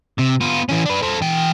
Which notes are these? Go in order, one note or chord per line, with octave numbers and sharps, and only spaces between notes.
C3
B3 F4
E3 C#4
D4 B4
A4 C5
E3 G5